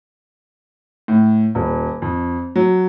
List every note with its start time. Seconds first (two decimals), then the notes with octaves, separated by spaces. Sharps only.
1.08 A2
1.55 D#1
2.02 F2
2.56 F#3